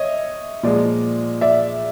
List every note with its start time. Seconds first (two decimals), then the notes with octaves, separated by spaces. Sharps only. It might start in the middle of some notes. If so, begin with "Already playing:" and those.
Already playing: C#5 D#5 E5
0.63 A#2 F3 G#3 D5
1.41 D5 E5